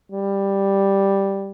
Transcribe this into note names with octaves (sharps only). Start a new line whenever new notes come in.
G3